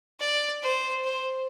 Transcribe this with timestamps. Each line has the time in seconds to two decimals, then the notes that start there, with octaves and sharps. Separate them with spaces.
0.20 D5
0.62 C5
1.04 C5